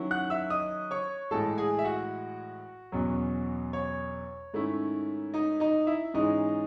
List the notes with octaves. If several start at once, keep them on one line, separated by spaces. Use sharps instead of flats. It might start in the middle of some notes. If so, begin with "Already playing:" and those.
Already playing: D#3 F#3 C#4 E4
F#5 F#6
E5 E6
D#5 D#6
C#5 C#6
A2 E3 G#3 A4 A5
G#4 G#5
E5
F#4 F#5
E2 B2 F#3 C#4
C#5
G#2 D#3 A3 C#4 E4
D#4 D#5
D#4 D#5
E4 E5
G#2 E3 G#3 C#4 D#4 D#5